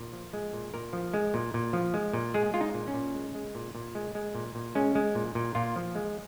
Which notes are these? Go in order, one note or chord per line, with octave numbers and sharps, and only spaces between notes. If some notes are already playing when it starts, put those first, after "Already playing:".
Already playing: A#2
F3
G#3
A#2
A#2 A#4
F3
G#3
A#2
A#2
F3
G#3
A#2
G#3 G#4
G#3 F4
D#4
A#2
C#4
A#2
G#3
G#3
A#2
A#2
G#3
G#3
A#2
A#2
G#3 C#4
G#3
A#2
A#2
A#2 F4
F3
G#3